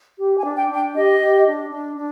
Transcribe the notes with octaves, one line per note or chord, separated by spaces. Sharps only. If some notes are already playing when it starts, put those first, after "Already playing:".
G4
G#5
D4
G5
D4
G5
G4 D#5
G4
D4
D4
D4